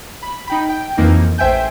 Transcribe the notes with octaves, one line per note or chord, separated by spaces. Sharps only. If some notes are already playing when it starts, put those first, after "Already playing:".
B5
D#4 G5 B5
G5
F2 E3 A#3 C4 D#4
A1 C5 E5 G5 G#5 G6